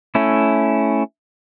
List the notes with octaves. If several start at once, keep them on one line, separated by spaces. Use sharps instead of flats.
A3 C#4 E4